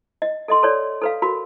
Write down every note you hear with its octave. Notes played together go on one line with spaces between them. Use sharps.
D#5
A4 D#5 C6
A4 B4 C#5 D5
A4 B4 F5
F#4 A#4 B5